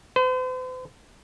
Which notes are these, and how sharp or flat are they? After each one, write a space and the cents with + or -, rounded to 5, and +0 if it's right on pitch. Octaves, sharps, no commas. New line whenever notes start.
C5 -45